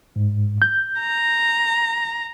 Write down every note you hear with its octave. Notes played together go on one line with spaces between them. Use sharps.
G#2
G6
A#5